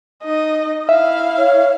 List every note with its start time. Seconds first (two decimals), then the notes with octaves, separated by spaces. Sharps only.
0.23 D#4 D#5
0.89 E4 E5 F5
1.38 C#5